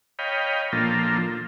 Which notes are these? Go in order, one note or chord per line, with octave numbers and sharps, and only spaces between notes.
C#5 D#5 F5 G5 B5
A#2 F3 A#3 D4 F4 A4